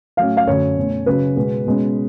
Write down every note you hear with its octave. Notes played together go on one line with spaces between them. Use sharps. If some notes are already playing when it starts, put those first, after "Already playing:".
A2 F#3 A3 C#4 F5
F5
F#2 D3 F#3 A3 C#4 C#5
B2 A3 C#4
C#3 F#3 C#4 B4
B2 G#3 B3
B2 G#3 C#4